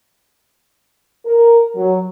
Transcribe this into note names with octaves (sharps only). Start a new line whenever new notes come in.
A#4
F#3